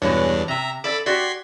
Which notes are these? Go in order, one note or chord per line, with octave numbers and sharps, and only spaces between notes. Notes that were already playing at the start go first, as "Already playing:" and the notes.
E2 G2 B2 G#3 D4 C#5
C3 E5 A#5
A4 D5 B5 D6 E6
F#4 G4 D5 C6 G#6 B6